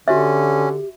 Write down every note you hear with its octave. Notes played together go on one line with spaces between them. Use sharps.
D3 C#4 F#4 G4 E5